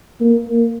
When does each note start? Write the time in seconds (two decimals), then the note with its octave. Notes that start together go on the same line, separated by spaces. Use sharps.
0.21 A#3